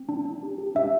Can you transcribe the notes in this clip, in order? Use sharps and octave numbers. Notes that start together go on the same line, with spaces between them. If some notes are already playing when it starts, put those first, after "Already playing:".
Already playing: C4
D4
D4
G4
G4
D4 E5